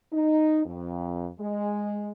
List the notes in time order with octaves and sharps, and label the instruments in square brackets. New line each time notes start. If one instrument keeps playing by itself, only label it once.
[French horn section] D#4
F2
G#3